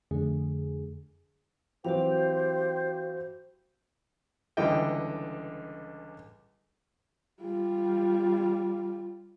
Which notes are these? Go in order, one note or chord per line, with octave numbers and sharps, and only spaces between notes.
F2 D3 A3 G#4
E3 F#3 C4 F#4 G4 C5 F5
C#2 D3 E3 G3 D#5 G5
G3 F4